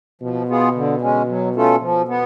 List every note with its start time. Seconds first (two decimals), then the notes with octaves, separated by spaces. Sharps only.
0.21 B2 F3
0.48 B3 F4 G#4
0.75 D3
1.01 G#3 C#4
1.28 F#3
1.55 A3 C#4 F4 A4
1.81 B2 F3
2.08 B3